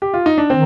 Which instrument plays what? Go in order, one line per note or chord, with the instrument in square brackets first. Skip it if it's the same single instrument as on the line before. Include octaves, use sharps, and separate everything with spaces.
[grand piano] G4
F4
D#4
D4
[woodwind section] D#3 [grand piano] C4